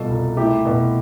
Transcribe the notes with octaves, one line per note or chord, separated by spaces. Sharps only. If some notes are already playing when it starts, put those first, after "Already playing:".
Already playing: B2 G3 F4 A4
C2
A3 E4 G4
B2